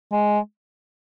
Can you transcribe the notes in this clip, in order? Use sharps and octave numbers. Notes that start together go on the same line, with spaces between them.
G#3